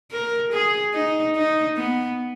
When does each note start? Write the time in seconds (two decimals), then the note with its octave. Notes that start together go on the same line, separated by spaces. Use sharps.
0.12 A#4
0.53 G#4
0.94 D#4
1.36 D#4
1.77 B3